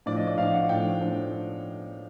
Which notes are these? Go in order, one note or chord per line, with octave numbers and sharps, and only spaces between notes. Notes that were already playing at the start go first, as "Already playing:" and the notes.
A2 F3 A3 D4 D5
D#5
D5
A2 F3 A3 D4 F5
F#5
A2 F3 A3 D4 G5
A2 F3 A3 D4